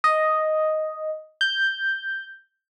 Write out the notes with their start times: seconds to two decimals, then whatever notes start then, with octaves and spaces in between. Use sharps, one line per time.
0.04 D#5
1.41 G6